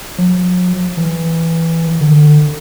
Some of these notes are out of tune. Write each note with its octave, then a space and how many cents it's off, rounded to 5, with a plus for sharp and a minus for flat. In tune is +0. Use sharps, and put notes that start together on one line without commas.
F#3 -45
E3 +0
D3 +30